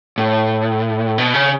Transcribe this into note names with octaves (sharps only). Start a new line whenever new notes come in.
A2
B2
C#3